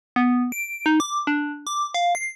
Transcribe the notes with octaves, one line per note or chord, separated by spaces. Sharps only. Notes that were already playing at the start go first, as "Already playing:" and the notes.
B3
D7
D#4
D6
D4
D6
F5
C7